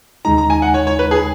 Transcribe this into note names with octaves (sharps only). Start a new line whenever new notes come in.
D#2 C#3 G#3 D#4 A#5
A#5
G#5
F#5
C#5
C#5
B4
G#4